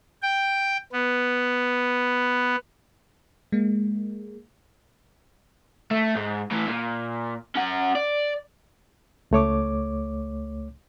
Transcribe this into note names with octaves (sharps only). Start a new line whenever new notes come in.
G5
B3
G#3 A#3
A3
G#2
A2 E3
A#2
C#4 F#5
D5
C#2 A3 C#5 D6